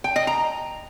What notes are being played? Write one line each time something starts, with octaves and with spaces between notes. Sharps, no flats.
G5
D#5
A#5